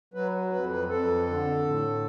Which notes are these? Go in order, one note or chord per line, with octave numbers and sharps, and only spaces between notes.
F#3 B4
F2 B4
B4
F2 A4
D3
A2